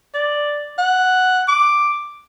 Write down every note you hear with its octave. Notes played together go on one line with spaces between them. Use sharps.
D5
F#5
D6